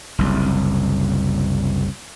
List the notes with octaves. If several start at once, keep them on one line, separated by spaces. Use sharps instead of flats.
F#1 C2